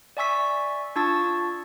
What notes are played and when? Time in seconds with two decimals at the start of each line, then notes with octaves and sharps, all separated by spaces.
0.17 D5 E5 G#5 C#6 E6 B6
0.96 D4 F4 A5 C#6 E6 A6